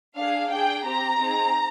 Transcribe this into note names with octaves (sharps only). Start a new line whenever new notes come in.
D4 G#4 F5
D4 G#4 G5
C4 G4 A#5
C4 D#4 G#4